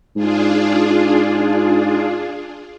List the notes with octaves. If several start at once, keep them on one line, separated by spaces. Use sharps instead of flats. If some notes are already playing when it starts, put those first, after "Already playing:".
G#2 D4 F4 G#4